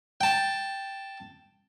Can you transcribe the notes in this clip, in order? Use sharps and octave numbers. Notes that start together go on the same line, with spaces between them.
G5 A5